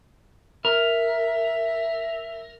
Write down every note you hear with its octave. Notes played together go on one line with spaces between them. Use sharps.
A#4 E5